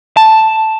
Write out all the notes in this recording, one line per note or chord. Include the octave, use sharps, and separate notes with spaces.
A5